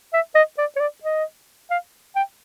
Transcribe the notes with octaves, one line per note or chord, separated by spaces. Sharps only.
E5
D#5
D5
C#5
D5
D#5
F5
G5